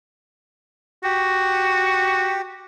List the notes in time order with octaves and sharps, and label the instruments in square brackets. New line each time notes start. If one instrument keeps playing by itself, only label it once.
[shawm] F#4 [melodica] G4